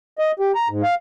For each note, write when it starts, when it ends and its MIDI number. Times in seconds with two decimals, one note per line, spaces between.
0.19 0.31 75
0.40 0.52 67
0.55 0.68 82
0.69 0.82 44
0.83 0.95 77